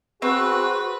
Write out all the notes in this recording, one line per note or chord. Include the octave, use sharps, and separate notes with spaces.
C4 F#4 G#4 B4